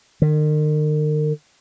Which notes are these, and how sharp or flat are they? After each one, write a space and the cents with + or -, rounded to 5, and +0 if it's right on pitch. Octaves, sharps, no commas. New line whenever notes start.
D#3 -40